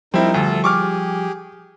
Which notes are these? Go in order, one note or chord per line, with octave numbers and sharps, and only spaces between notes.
F3 G3 C4 D#4 E4 A#4
D2 A4
G4 G#4 C#6 D6 F6